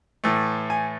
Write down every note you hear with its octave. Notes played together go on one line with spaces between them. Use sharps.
A2 E3 A3
G#5